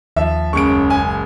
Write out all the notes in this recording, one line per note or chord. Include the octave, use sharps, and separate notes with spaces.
D#2 F3 E5
F#1 C#2 C#4 C#6 D7
G#5